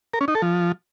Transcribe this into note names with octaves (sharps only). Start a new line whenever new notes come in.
A#4
C#4
D#4
A4
F3